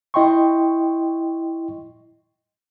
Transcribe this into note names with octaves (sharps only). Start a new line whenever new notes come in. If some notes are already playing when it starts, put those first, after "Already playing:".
E4 D#5 G5 C6 C#6